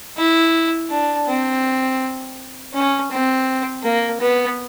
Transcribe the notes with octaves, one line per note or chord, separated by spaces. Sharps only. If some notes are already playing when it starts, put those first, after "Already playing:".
E4
D4
C4
C#4
C4
A#3
B3